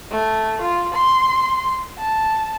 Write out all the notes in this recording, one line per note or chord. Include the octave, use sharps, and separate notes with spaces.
A3
F4
C6
A5